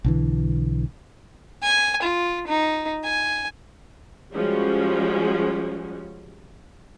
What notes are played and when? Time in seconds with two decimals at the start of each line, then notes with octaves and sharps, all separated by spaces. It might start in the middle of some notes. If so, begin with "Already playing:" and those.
0.04 B1 D3 E3
1.63 G#5
2.02 F4
2.47 D#4
3.04 G#5
4.34 F3 G3 G#3 C#4 F#4